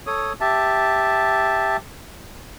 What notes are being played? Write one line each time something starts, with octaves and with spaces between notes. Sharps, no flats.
A4 C#5 D#6
G4 E5 A5